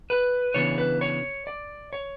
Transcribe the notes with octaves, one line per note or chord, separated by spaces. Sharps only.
B4
C#3 E3 B3 D4 C#5
B4
C#5
D5
C#5